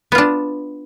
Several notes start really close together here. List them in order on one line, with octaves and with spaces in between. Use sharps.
B3 F4 D4